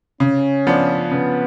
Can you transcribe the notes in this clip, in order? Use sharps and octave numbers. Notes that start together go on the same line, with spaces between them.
C#3 C#4
F3 B3 D4
C#3 B3